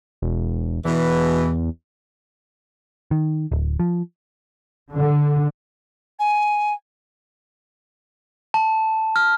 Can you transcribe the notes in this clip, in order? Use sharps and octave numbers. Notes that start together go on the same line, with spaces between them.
E1
E2 B2 E3
D#3
D1
F3
D3
G#5
A5
F6